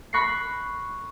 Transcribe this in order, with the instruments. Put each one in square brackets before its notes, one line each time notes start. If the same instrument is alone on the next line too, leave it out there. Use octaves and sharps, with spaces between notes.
[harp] B5 C#6 F#6 A#6 C7